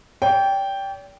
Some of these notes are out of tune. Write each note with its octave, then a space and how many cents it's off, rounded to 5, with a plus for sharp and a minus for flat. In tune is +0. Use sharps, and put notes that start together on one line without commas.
D5 -45 G5 +0